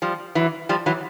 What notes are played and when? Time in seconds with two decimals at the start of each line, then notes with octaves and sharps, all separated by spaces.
0.02 F3 G3
0.35 E3 F#3
0.69 F3 G3
0.86 E3 F#3